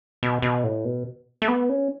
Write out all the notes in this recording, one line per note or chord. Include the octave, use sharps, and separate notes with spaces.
B2
B2
A2
B2
A3
B3
C#4